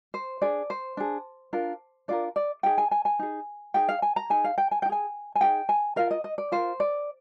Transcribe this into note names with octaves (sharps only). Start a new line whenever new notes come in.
C5
D4 G#4 D5
C5
D4 G#4
D4 F4 A#4
D4 F4 A#4 D5
D5
D#4 G#4 G5
G#5
G#5
G#5
D#4 G#4
D#4 G#4 G5
F5
G#5
A#5
D#4 G#4 G#5
F5
G5
G#5
D#4 G5
G#4 G#5
G#5
D#4 G#4 G5
G#5
F4 A#4 F5
D#5
D#5
D5
F4 A#4 C5
D5